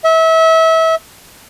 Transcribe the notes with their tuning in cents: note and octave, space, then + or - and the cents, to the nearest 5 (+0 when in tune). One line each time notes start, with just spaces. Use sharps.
E5 -30